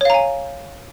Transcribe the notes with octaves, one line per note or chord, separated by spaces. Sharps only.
C#5 F5 G#5 A#5